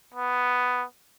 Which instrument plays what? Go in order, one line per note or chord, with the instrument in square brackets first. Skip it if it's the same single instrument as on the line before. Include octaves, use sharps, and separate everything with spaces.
[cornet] B3